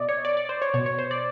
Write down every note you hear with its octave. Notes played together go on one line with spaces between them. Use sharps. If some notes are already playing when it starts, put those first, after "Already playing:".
Already playing: B2 D5 D#5
C#5
D5
D5
C5
C#5
B2 C#5
C#5
C5
D5